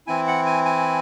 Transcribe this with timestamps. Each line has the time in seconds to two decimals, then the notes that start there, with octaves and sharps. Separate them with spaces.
0.07 E3 C4 E4 G#5
0.27 F#5
0.46 G#5
0.65 G#5